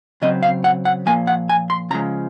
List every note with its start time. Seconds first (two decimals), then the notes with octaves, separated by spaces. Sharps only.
0.22 C#3 F#3 C4 D#5
0.43 F5
0.64 F#5
0.85 F#5
1.06 A#2 F3 A#3 G#5
1.27 F#5
1.49 G#5
1.70 C6
1.91 C#3 F3 G#3 A#5